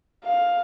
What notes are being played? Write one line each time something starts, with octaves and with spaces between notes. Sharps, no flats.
F5